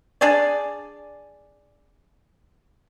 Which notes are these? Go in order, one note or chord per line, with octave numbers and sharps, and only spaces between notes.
D4 G#4 D5